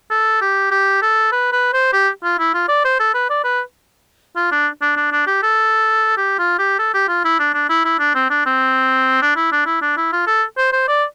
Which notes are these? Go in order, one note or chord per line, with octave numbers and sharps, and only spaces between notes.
A4
G4
G4
A4
B4
B4
C5
G4
F4
E4
F4
D5
C5
A4
B4
D5
B4
F4
D4
D4
D4
D4
G4
A4
G4
F4
G4
A4
G4
F4
E4
D4
D4
E4
E4
D4
C4
D4
C4
D4
E4
D4
E4
D4
E4
F4
A4
C5
C5
D5